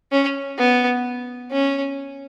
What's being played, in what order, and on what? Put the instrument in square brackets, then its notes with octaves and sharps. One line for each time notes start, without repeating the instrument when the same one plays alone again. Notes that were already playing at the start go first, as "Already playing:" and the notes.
[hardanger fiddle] C#4
B3
C#4